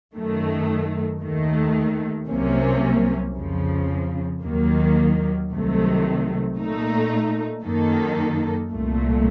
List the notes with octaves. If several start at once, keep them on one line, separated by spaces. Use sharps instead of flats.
F#2 D#3 A3
D#2 D#3 A3
C2 C3 F#3 A#3 C#4
F2 C#3 F3
D#2 D#3 F#3 A#3
C2 C3 D#3 F#3 A3
A#2 A3 D#4
F#2 D#3 A#3 D#4 A4
C2 A#2 A3